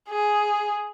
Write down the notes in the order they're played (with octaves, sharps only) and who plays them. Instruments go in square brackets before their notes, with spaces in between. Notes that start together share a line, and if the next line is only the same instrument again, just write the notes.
[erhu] G#4